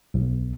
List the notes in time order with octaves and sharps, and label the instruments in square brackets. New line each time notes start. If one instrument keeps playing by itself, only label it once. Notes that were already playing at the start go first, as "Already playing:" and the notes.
[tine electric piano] B1